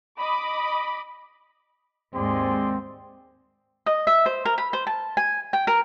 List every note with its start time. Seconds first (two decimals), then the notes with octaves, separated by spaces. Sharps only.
0.19 D#5 B5 D6
2.14 D#2 G#2 C4 G#4 D5 C6
3.86 D#5
4.07 E5
4.26 C5
4.45 A#4
4.58 B5
4.73 C5
4.87 A5
5.17 G#5
5.53 G5
5.67 A#4